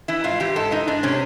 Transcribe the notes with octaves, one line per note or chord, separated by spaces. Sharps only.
E3 E4
G#2 F4
E3 G4
G#2 A4
E3 D#4
G#2 D4
C3 C#4